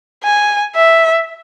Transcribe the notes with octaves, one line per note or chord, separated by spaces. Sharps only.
G#5
E5